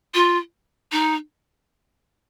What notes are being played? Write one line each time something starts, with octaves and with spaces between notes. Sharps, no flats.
F4
D#4